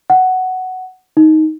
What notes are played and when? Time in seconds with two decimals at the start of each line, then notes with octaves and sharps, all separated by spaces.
0.10 F#5
1.17 D#4